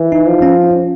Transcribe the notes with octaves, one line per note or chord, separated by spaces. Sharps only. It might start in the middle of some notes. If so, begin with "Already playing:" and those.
Already playing: E3
D#4
F3
C#4